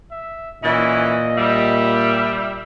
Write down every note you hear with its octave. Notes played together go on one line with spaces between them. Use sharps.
E5
A#2 E3 C#4 E4 D#5
G3 E5